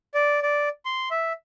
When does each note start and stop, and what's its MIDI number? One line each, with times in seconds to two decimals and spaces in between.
0.14 0.40 74
0.43 0.69 74
0.85 1.09 84
1.11 1.33 76